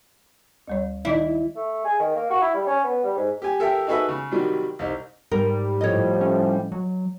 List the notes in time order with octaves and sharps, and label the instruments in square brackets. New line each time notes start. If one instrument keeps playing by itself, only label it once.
[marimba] D2 G3 C#5
[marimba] D#3 D#4 D#5 [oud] E4
[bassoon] A3
G#4
D#3
A#3
F#4
E4
G3
C#4
B3
G3
G#2
[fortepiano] G4 G#5
G4 A4 A#4 E5 G5
D#4 F#4 G#4 A4 B4 E5
C#3
C3 D#3 F#3 G3
C2 D#4
[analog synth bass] G#2 [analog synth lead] G3 [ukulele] A#4
[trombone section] A2 F3 [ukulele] C#5 D#5
[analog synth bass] C#4
F#3